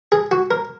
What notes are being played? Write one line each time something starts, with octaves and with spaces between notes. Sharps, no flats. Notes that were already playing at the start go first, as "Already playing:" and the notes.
G#4
F#4
A#4